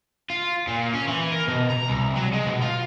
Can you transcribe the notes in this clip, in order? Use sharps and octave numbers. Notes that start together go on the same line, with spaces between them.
F4
A#2
C#4
E3
A#4
B2
A#5
C2
F#3
G#3
B2
F4